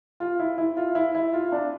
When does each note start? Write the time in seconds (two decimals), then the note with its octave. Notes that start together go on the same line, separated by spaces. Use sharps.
0.20 F4
0.40 E4
0.58 E4
0.77 F4
0.95 E4
1.15 E4
1.33 F4
1.52 D4